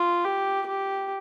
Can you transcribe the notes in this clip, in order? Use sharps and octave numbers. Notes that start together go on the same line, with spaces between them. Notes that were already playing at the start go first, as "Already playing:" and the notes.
Already playing: F4
G4
G4